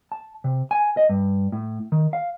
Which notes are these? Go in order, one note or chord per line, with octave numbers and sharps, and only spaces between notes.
A5
C3
G#5
D#5
G2
A2
D#3
F5